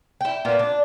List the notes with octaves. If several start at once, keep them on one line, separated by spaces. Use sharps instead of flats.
E4 G5
A#2 B3 A#4
D4